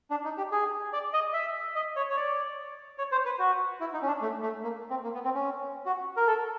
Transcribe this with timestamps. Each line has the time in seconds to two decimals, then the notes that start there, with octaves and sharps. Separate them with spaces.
0.11 D4
0.24 D#4
0.38 G4
0.52 G#4
0.93 D5
1.13 D#5
1.33 E5
1.75 D#5
1.96 C#5
2.10 C#5
2.17 D5
2.98 C#5
3.12 C5
3.26 B4
3.39 F#4
3.81 E4
3.94 D#4
4.02 C#4
4.07 D4
4.21 A3
4.43 A3
4.63 A#3
4.90 C4
5.04 A#3
5.14 B3
5.25 C4
5.34 C#4
5.86 F#4
6.17 A#4
6.27 A4